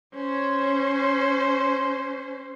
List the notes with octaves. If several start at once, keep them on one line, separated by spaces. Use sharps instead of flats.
C#4 C5